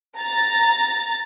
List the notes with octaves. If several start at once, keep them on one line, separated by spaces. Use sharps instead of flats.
A#5 A6